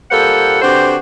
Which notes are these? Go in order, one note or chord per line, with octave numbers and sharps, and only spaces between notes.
A#2 G3 A#3 A4 C5 F#5
D3 C4 F#4 G4 B4 C5